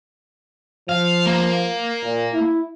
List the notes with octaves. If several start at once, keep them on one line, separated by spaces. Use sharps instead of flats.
F3 F5
A#3
A#2
E4